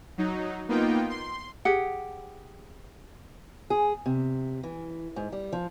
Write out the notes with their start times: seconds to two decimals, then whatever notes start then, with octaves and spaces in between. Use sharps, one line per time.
0.18 F#3 D#4
0.68 A#3 B3 D#4 F4 G5
1.10 C6
1.65 G4 G#4 F#5
3.70 G#4
4.06 C3
4.63 E3
5.16 G#2
5.32 G3
5.52 F3